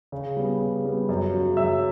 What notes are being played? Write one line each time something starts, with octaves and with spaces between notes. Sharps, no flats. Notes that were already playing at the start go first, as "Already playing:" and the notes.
C#3
G3 B3
C#3
G3 B3
F#2
C#3 F#3
F#2 E5 E6